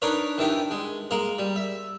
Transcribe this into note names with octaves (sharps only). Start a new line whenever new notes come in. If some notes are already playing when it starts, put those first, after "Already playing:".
D4 D#4 A#4 B4 C#5
D#3 E3 D4 G4
G#3
G#3 A#3 A#4
G3
E5